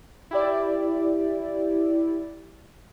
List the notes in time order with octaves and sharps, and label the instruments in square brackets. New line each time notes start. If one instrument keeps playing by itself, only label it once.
[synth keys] E4 G4 D5